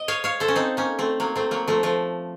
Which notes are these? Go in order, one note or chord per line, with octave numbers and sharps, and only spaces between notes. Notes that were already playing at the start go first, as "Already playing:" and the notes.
Already playing: D#5
C#5 F5
C#5 F5
A4 C5
C#4
C4 D#4
A#3 C#4
A3 C4
F#3 A#3
A3 C4
F#3 A#3
F3 A3
F3 A3